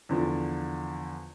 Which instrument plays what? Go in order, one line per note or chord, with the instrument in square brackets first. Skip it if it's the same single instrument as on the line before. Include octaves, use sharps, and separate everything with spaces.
[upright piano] E2 D3 F3